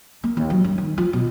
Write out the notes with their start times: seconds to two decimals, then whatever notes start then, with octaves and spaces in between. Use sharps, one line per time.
0.24 A#3
0.37 D#2
0.50 F#3
0.64 G2
0.78 D#3
0.98 F3
1.13 B2